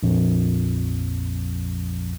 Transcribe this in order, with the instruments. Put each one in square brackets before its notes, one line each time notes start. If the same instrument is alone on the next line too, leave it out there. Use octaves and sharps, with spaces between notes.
[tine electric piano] A#1 F2